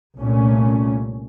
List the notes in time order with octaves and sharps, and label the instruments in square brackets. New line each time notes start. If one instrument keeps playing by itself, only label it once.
[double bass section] C2 A#2 A3 C#4